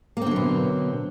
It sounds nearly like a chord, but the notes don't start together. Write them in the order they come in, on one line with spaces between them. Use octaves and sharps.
A#3 C4 D3 F#3 B2